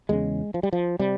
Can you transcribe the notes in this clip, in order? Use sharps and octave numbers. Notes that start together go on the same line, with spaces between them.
E2 C#3 G#3
F3
G3
F3
C3 G3